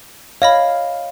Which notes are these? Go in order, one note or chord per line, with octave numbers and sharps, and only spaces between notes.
C#5 D#5 F5 B5